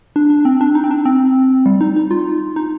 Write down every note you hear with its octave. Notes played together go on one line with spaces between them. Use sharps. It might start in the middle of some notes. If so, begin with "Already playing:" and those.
D4
D4
C4
D4
D#4
C4
D4
C4
G3
D#4
D#4
F4
D#4